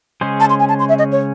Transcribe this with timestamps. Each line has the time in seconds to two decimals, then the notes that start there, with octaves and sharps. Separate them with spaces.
0.21 C#3 G#3 C#4 G#4 C5
0.40 A5
0.50 C6
0.60 G#5
0.69 A5
0.79 C6
0.89 E5
0.99 D#5
1.12 C#5